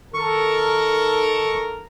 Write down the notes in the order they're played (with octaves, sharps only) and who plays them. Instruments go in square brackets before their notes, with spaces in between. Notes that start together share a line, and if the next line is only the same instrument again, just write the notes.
[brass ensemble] D#3 A4 A#4 [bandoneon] C#6